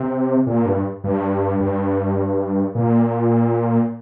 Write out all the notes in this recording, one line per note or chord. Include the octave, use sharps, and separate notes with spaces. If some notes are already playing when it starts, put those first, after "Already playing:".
Already playing: C3
A#2
G2
G2
G2
A#2